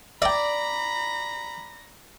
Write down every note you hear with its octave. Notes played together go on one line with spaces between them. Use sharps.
D5 E5 G5 A#5 B5 A#6